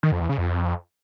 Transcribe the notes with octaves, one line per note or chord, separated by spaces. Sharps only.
D#3
F2
E2
C#3
F2